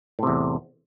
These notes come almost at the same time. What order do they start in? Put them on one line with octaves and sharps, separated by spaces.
A2 C3 E2